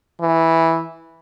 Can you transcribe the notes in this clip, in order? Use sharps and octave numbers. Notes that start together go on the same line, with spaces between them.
E3